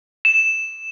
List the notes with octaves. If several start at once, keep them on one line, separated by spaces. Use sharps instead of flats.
E7